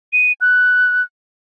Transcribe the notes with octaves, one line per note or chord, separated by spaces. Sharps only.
D#7
F#6